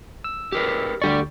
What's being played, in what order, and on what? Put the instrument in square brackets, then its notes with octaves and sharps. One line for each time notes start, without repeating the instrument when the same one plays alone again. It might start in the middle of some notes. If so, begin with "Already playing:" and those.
[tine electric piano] E6
[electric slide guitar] G4 A#4 B4
[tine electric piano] D2 D3 C#6 [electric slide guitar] G4 D5